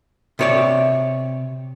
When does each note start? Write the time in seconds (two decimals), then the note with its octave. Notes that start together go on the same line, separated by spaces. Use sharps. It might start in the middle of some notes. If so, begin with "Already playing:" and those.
0.39 C3 C#5 D5